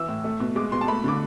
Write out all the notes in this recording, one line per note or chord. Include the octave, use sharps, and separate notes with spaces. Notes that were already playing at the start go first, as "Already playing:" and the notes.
Already playing: E3 E6
A2
A3
B2
G#3 D6
B2 C6
A5
A3 B5
D3 D6